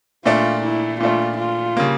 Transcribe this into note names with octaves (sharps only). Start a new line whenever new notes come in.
A#2 A3 D4 F4
E4
A#2 A3 D4 F4
F4
C#3 G3 A#3